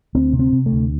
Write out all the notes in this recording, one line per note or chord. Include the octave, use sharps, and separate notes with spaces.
D2 C4
C3
C4
C3
A3
D2